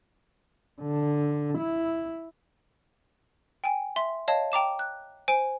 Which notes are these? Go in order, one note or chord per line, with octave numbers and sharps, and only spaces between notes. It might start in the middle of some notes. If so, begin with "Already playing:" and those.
D3
E4
G5 G#5
E5 C6
C#5 D#5 F5 A5
G5 A#5 D6 E7
F#6
C5 G#5 D7